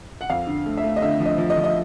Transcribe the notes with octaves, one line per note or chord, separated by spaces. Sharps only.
F#5
F2 F5
D3
A3
E5
A3
D#5
D3 E5
F3
D#5
F3
D#5
F3
D#5